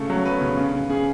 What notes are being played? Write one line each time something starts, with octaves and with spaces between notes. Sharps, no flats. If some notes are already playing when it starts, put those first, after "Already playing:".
Already playing: C#3 A3
F#3
B3 B4
C#3
C#3
C#3
C#3 G#4